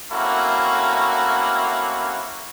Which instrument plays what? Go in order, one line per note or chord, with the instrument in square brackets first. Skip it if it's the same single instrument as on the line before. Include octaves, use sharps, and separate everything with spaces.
[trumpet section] A3 A#3 C4 C#4 E4 F#4